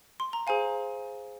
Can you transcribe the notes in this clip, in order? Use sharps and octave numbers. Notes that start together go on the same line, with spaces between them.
C6
A#5
G#4 C5 F5 G#5